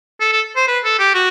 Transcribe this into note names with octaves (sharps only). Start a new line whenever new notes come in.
A4
A4
C5
B4
A4
G4
F#4